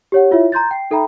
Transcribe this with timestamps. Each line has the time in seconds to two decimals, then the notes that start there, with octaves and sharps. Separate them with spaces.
0.12 G4 C#5 F#5
0.31 E4 F4 C#5 E5
0.52 A#5 C6 G6 A6
0.71 G5 C7
0.91 D#4 A4 E5 G5 A#5 B5